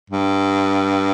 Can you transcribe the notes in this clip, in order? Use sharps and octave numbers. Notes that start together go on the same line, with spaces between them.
G2